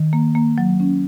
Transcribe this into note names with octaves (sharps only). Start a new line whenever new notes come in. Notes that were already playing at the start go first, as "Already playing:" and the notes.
Already playing: D#3
A#3
A#3
F#3
C#4